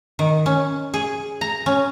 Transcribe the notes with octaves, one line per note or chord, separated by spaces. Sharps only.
D#3
C#4
G#4
A#5
C#4